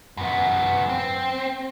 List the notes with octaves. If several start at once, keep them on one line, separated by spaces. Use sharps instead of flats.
F#2 B3
C4